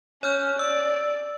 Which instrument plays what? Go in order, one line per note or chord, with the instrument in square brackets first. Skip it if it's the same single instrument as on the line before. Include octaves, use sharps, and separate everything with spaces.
[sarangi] C#4 [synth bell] C#5 F6 G6
[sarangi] D5 [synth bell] E6